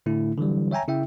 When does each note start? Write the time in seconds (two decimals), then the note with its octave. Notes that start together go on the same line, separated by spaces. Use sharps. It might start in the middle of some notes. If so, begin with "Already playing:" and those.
0.06 A2 D3 A3 E4
0.38 D3 E3 F#3 G3
0.71 C#5 E5 G5 G#5 A#5
0.88 C#3 E4 E5 G5